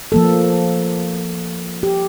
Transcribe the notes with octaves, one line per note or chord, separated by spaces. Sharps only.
F3 A#3 A4
G4